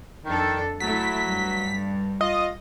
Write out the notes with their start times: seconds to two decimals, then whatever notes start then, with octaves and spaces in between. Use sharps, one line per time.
0.25 F2 D#3 D4 A4
0.80 F#3 A3 E4 B6
1.25 G2
2.21 F4 D#5